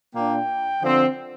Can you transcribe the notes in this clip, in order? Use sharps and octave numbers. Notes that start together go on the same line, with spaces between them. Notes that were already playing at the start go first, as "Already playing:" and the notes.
A#2 A#3 D4 G5
D3 F3 C4